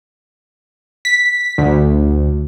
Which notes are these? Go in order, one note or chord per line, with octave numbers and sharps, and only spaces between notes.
B6
D2